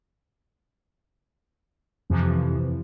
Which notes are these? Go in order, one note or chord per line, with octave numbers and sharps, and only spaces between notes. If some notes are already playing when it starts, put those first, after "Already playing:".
F2 C3 E3 F3